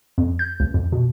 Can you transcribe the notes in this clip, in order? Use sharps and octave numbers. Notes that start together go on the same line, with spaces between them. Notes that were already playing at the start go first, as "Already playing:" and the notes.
F2
G6
C#2
F2
B2